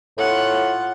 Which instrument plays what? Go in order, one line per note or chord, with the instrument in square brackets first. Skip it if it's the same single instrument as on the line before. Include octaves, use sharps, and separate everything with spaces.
[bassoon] A2 [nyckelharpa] F4 F#5